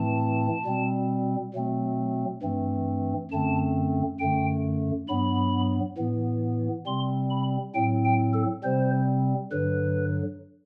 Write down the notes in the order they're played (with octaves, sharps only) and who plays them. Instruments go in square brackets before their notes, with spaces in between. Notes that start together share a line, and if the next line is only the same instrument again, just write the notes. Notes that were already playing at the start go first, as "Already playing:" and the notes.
Already playing: [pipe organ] A2 E3 A3 C4 A5
B2 G3 C4
B2 F#3 A3 C4
G2 E3 A3 C4
F#2 D3 A3 C4 A5
F#2 D3 A3 G5
G2 F#3 B3 B5
A2 E3 B3
C3 G3 C4 C6
B5
A2 F#3 C4 G5
G5
A4
C3 G3 C4 C5
G2 D3 F#3 B4